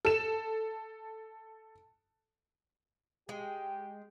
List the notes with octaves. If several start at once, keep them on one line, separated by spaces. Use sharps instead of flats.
A4 E7
G#3 G4 G#4 G5